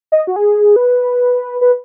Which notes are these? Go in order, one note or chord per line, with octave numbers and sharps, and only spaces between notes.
D#5
F#4
G#4
B4
B4